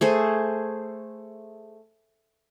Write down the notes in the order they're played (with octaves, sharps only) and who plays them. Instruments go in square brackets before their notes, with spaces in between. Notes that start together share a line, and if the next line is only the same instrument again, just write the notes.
[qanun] A3 G#4 C5